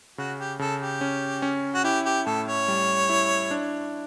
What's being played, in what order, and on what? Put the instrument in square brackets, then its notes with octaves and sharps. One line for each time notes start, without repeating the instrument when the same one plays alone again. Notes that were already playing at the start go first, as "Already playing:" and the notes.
[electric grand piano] C#3 [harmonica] F#4
[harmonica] G4
[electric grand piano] C#3 [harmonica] A4
[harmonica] G4
[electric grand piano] C#4
C#4
[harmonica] F#4
[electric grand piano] E4 [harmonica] G4
[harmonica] G4
[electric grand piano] A2 [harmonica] A4
[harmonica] C#5
[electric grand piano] G3
E4
D4